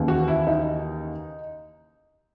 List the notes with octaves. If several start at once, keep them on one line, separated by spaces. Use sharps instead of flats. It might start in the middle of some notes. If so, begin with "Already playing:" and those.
Already playing: D#2 C#3 E3
F#4
E4
D#4